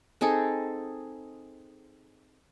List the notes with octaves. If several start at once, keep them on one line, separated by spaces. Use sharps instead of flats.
C4 D#4 G#4 A4